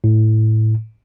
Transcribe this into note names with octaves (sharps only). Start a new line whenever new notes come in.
A2